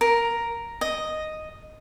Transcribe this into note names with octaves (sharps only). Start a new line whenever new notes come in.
A#4
D#5